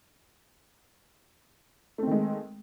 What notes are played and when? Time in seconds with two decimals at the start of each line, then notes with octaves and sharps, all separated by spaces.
1.98 A3
2.03 C4
2.07 D#3
2.11 G#3